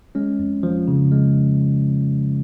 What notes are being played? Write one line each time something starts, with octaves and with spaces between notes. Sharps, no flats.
G#3 C#4
F2
F3
C#3
G#3